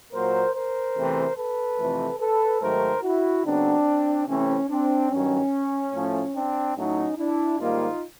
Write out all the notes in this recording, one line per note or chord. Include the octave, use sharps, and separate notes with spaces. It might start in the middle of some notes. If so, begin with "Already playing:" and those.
A#2 F#3 A#3 A#4 C5
A#4 C5
E2 C3 E3 A3 C4
A4 B4
F2 C3 E3 A3 C4
A4 B4
G#2 D#3 F#3 A3 A#4 C5
E4 F#4
C#3 F#3 B3 C4 D4
C3 E3 A3 C4 C#4
C4 D4
G2 D#3 F#3 C#4
A2 F3 A3
C4 D4
A2 F#3 A3 C#4 D#4
D4 E4
G#2 D#3 G3 A#3 D#4 F4